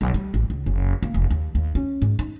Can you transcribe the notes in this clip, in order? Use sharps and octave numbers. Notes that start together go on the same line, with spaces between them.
B1
G3
A1
C#2
F#1
A#3
F1
D#2
D#2
C#4
G#2
D#4